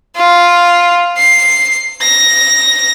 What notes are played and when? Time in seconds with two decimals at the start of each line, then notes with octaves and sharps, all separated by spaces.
0.17 F4
1.18 C7
2.02 A#6